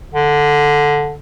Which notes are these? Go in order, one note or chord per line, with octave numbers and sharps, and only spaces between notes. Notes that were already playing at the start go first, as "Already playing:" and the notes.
D3